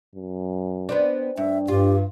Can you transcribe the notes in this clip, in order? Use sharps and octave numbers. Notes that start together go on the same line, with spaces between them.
F#2
B3 C4 D4
G2 D4 E5
G2 F4 G4